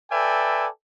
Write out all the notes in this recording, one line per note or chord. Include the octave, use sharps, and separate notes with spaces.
A4 B4 D5 E5 G5 G#5